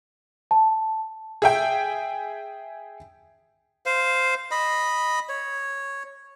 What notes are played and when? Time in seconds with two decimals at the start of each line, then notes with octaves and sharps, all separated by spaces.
0.51 A5
1.42 G#4 E5 G5
3.86 C5 F5
4.51 D#5 B5
5.29 C#5